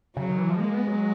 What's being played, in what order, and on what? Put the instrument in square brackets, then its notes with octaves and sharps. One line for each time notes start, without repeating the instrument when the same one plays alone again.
[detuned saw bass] C#3 [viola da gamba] F#3
[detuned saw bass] D#3
E3
F3
[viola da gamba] G#3 [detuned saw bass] A#3
[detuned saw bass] B3
F#3